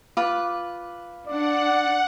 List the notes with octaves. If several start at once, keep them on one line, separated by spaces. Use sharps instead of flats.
F4 B4 D6
D4 D5 F#5